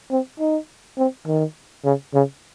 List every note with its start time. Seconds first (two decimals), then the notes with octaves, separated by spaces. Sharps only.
0.11 C4
0.40 D#4
0.98 C4
1.27 D#3
1.84 C#3
2.14 C#3